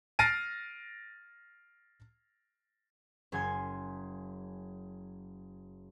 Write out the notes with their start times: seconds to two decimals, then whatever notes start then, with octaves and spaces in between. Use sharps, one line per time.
0.19 F6 A6 A#6 C7 D7 D#7
3.32 F#1 F#3 G#5 C6 G#6